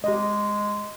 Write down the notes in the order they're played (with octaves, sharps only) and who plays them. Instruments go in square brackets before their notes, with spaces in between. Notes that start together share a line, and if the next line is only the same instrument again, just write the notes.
[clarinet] G#3 [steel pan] G4 D#5